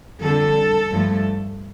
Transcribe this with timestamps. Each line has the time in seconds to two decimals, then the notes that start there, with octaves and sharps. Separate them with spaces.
0.21 F2 D3 G3 A4
0.90 G2 F3 A3